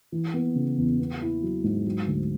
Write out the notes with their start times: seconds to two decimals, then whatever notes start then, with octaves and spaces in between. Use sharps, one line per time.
0.12 E3
0.34 B3
0.55 C#3
0.78 E2
0.99 B3
1.21 E4
1.43 F#3
1.64 G#2
1.86 F#3
2.07 D2